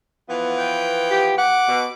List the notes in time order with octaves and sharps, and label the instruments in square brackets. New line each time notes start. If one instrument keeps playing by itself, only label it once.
[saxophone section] E3 F3 B3
[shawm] G5
[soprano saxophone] G4
[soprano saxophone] F#5 [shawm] D6
[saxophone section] B2